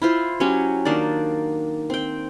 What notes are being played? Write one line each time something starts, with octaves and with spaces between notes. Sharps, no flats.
E4 F4 C5
F#3 C#4 G4
D#3 A#3 D4 D5
C4 G5